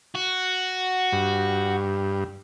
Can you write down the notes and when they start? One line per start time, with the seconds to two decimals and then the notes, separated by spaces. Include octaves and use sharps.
0.15 F#4
1.12 G2